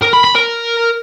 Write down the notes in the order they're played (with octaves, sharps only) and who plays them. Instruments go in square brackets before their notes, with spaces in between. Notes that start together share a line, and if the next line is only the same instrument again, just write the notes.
[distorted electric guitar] A#4
B5
B5
A#4